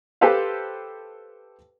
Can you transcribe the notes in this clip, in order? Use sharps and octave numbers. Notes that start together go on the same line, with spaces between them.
G4 A4 B4 C5 F5